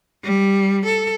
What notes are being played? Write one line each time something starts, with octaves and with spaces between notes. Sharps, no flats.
G3
A4